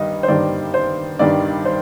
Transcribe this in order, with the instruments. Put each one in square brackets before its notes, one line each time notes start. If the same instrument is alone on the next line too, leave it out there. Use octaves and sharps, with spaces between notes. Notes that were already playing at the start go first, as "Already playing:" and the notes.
Already playing: [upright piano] G2 D#3 G3 D#5
C5
G2 D#3 G3 D5
C5
G2 D#3 G3 D5
C5